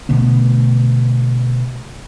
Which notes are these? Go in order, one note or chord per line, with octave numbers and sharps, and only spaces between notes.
B2 D3 A3 B3